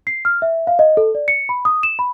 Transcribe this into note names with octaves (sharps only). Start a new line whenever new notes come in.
C7
F6
E5
F5
D#5
A4
D5
C#7
B5
D#6
E7
B5